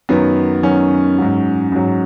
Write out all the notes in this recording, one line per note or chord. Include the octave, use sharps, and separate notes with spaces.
F#2 D#3 F#3 B3
F#2 D#3 F#3 C#4
G#2 F#3
G#2 F#3